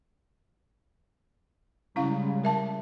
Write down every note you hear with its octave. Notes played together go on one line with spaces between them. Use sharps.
C#3 G3 G#3 C#4 E4 F5
A#4 E5 A5